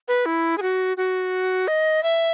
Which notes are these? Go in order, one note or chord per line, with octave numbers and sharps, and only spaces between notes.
B4
E4
G#4
F#4
F#4
D#5
E5